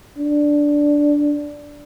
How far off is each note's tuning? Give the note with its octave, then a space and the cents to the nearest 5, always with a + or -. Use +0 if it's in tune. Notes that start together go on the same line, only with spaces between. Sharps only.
D4 -5